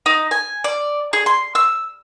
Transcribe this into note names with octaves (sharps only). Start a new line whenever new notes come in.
D#4
G#5
D5
G#4
C6
E6